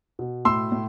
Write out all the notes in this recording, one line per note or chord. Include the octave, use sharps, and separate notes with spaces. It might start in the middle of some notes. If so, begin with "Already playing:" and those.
B2
A2 C6 E6
A2